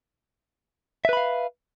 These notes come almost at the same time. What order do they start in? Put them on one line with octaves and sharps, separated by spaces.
E5 B4 B5 F5